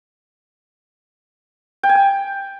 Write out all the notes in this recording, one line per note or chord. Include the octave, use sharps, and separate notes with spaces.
G5
G#5
G5